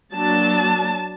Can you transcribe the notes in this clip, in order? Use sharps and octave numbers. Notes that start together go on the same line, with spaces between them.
F#3 A#3 D4 A5